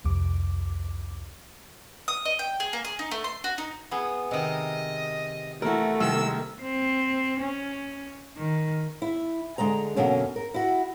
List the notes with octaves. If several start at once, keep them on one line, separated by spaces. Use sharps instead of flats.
C2 F2 D6
D#6
D#5
G5
G#4
A#3
G#4
D#4
A3
C6
F#4
D#4
B3 E4 G#4
C3 D#3 D#5
E3 A3 E4 F#4 A#4
C2 D#3 E6
C4
C#4
D#3
E4
D3 G#3 D#5 A#5
F#2 B2 D3 A#3 C#4
A#4
E4 F#4